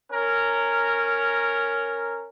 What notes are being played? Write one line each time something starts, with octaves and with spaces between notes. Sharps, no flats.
C#4 A#4